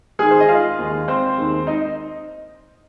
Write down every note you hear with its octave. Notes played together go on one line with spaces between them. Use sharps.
G#2 D#3 G#3 G#4 G#5
C5
D#5
F4 F5
D#2 D#3 G#3
C4 C5
D#2 D#3 G#3
D#4 D#5